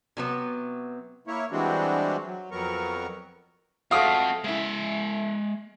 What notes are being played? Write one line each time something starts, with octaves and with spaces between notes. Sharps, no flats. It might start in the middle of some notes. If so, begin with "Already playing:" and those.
C3 F#3 B3
A#3 E4 C#5
E3 G3 G#3 C4 D4 F#4
F#3
F2 F#3 B3 A#4 C#6
F3 G#3 A3 C4 F#4 F5 D#6
C#3 G#3 E4 E5